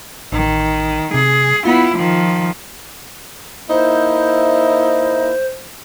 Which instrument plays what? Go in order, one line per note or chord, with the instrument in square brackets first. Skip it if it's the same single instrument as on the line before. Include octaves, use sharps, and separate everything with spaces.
[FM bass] A1 [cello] D#3
[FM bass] C3 [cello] G#4
[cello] B3 E4 [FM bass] F4
[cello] D#3 F3
[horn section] A#3 D#4 E4 [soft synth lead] C5